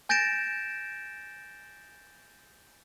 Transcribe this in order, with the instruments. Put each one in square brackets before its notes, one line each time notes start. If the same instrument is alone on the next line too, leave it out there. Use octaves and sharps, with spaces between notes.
[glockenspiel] G#5 G6 A6 A#6 D7 E7